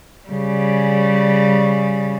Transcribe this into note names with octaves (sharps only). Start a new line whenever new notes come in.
C#3 G3